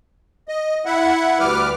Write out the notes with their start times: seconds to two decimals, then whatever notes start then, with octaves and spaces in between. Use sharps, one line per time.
0.48 D#5
0.85 E4 E5 F#5
1.40 D2 G3 B4 D6 F6